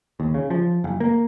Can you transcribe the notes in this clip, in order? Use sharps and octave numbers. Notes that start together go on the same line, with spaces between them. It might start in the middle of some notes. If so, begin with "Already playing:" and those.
D#2
C#3
F3
F#1
A#3